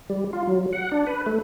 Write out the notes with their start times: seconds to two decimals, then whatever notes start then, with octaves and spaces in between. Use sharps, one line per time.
0.10 G3
0.33 F4
0.47 F#3
0.73 F#5
0.92 D4
1.07 B4
1.26 A3